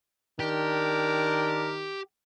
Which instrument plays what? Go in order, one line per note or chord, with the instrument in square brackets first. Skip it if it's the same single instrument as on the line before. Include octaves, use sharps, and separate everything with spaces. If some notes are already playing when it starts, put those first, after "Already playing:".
[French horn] D#3 [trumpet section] D4 A#4 [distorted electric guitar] G4